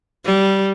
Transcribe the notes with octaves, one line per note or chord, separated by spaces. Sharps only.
G3